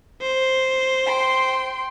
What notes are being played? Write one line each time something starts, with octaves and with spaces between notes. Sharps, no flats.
C5
G5 C6